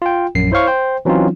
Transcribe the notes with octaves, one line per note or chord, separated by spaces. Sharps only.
F4 G5
A#1 F#2 C7
E4 C5 C#5 F5 C#6
C5 G5
E3 F#3 C4 C#4 D#4 F4